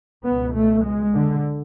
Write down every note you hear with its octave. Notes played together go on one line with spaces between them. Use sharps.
C#2 B2 B3
A3
G#3
D3